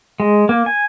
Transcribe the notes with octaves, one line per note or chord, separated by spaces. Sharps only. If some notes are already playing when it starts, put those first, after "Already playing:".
G#3
A#3
G#5